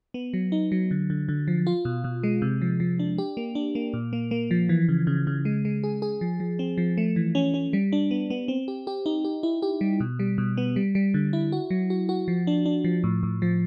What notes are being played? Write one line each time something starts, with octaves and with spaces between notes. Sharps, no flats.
B3
F#3
D#4
F#3
D3
D3
D3
F3
F4
B2
B2
G#3
C3
F3
F3
D4
G4
A#3
D4
A#3
A#2
A#3
A#3
F3
E3
C#3
C#3
C#3
G#3
G#3
G#4
G#4
F3
F3
C4
F3
A3
E3
C#4
C#4
G3
D4
B3
B3
C4
G4
G4
D#4
G4
E4
G4
G3
B2
G3
B2
B3
G3
G3
D3
E4
F#4
F#3
F#4
F#4
F3
D4
D4
F3
A2
A2
F3